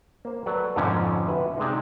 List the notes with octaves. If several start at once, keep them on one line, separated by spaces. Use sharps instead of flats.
A#3 C5
F#3 A4 B4 D5 F#5
F2 G#2 B2 D3 F3 C#4
F#4 B4 E5
C3 G#3 D4 D#4